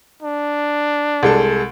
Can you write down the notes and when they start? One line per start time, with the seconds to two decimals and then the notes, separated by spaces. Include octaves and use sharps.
0.23 D4
1.23 C2 G#3 A4